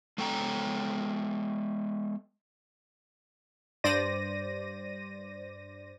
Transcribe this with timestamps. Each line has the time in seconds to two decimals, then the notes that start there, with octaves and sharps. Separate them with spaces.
0.18 G#3 B3 A4 G5 G#5 A#5
3.84 G2 C5 D5 A#6 D#7